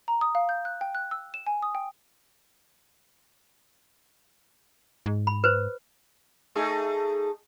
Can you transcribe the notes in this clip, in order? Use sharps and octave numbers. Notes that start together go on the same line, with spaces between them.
A#5
D#6
F5
G6
F#6
G5
F#6
E6
E7
G#5
D#6
G5
G#2
B5
B4 C5
A3 D#4 G#4